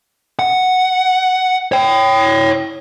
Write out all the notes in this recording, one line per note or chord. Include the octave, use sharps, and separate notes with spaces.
F#5
C#5 G5